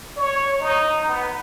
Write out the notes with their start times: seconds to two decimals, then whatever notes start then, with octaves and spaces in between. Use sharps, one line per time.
0.17 C#5
0.60 D#4
1.08 B3